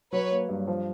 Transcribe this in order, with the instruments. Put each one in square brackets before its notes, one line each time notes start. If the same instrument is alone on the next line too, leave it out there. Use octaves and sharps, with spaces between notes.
[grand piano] F#3 [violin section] B4 C#5
[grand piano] A#3
G2
F3